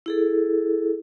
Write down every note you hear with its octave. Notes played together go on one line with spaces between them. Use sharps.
E4 G#4 A4